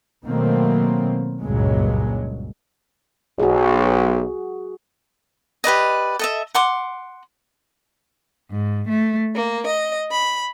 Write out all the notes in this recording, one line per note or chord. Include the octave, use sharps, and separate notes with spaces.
B2 D#3 F#3 A3 A#3 C4
F#1 C#2 G2 A#2 F#3 G#3
B1 F#4 G#4
G4 B4 D5 D#5
A4 D#5 E5
F#5 C6 D6
G#2
A3
A#3
D#5
B5